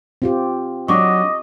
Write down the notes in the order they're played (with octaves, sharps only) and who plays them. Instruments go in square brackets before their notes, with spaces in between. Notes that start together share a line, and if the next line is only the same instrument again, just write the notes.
[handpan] C4 F4 G4
[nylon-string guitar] F#3 D4 [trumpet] D#5 [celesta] C#6 D6